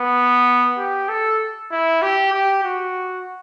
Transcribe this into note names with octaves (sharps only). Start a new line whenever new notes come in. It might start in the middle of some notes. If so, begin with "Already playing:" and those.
Already playing: B3
G4
A4
E4
G4
G4
F#4